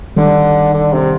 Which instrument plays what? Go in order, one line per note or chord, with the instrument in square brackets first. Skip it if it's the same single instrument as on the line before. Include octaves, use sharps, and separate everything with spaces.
[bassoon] D3 [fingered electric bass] D#3 G3
[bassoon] D3
C3